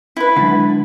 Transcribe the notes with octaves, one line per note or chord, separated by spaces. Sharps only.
E4 B4
D3 F#3 G#3